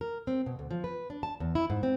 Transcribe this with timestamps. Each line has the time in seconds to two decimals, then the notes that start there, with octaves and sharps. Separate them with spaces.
0.01 A#4
0.27 C4
0.46 B2
0.59 D2
0.71 F3
0.84 B4
1.10 D4
1.23 A5
1.40 E2
1.55 E4
1.70 G#2
1.83 C4